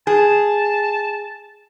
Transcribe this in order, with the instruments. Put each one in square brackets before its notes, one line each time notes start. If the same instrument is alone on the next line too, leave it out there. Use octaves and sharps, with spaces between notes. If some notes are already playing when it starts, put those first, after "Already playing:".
[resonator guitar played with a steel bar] G#4 [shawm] A5